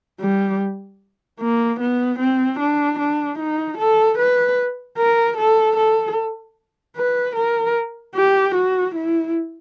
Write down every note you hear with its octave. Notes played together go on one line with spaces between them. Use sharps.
G3
A#3
B3
C4
D4
D4
D#4
A4
B4
A#4
A4
A4
B4
A#4
G4
F#4
E4